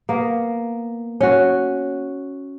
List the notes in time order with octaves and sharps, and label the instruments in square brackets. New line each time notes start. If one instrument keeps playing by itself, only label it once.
[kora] A#3 B3
C#4 F#4